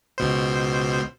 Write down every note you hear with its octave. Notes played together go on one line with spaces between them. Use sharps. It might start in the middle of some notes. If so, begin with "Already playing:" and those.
C#2 B2 C5